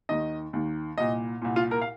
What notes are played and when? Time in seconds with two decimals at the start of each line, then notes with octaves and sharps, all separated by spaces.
0.09 D#2 D#3 D#5
0.53 D#2 D#3
0.97 C2 A#2 D#5
1.42 C2 A#2
1.56 F4
1.71 A#4
1.81 F5